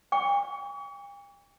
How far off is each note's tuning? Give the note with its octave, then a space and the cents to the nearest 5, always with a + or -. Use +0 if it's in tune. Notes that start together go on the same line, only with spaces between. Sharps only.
G5 +45 C#6 +45